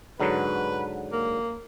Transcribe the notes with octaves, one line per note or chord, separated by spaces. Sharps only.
G#2 D3 F#3 B4
A#3